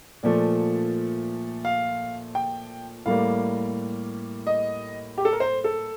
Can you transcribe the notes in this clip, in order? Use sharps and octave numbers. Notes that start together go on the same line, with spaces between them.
A#2 F3 A3 D5
F5
G5
A2 G3 A#3 F5
D#5
G4
A4
A#4
C5
A4